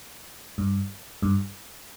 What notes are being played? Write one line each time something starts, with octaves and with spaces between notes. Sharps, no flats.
G2
G2